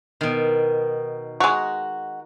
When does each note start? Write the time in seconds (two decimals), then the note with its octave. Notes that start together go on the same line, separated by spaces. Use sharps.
0.21 B2 D#3
1.40 G#3 F#4 A#5